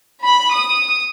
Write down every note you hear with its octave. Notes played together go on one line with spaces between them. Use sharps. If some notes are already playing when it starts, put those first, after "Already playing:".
B5
D#6